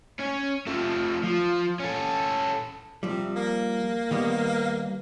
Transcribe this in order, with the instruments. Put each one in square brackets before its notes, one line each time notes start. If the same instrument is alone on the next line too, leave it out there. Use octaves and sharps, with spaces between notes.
[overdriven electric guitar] C#4
F3 A3
F3
C#4 A4
[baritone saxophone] C3 [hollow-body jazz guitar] F3 G3
[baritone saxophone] A#3
[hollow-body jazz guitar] D#3 G3 B3